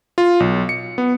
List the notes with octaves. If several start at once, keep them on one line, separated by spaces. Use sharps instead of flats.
F4
B1
C#7
B3